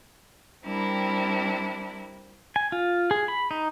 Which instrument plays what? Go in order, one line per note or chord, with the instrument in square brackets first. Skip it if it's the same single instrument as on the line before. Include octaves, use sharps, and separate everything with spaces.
[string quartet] G3 C4 D4 E4 A#4
[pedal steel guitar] G#5
F4
G#4
B5
D#4